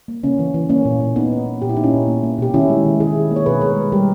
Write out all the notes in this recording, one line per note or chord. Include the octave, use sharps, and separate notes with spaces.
A#3
C#3 A#3 C#4
E3
E3
A#3 C#4
A#2
A#3
A#3 B3 D#4
A#3
A#3
A#2 G4
E4
A#3 D#4
C#4 E4
A#2
A#3
A#3
B2 G4
D#3 C#4 E4
G#3
D#3
D#3 E4 G#4
D#3
A#3
C#5
B2 G#4 B4
G#3 A#4 C#5
G#3
G3 G4 A#4